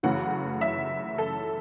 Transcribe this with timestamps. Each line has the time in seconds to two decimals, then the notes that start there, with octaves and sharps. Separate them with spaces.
0.03 F#2 C#3 E3 A3 C#4 F#5
0.61 E5
1.18 A4